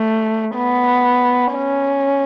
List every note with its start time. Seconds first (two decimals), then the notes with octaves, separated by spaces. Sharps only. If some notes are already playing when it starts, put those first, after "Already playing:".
Already playing: A3
0.56 B3
1.54 C#4